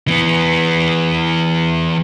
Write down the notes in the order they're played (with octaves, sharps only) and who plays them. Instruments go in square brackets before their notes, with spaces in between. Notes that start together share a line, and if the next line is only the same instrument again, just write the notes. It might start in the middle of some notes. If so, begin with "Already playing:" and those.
[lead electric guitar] E3 B3